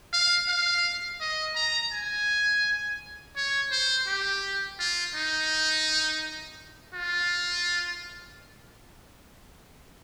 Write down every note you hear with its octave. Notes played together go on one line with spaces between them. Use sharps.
F5
F5
D#5
A#5
G#5
C#5
C5
G4
F4
D#4
F4